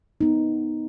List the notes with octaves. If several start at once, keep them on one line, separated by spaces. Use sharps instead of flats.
B3 D#4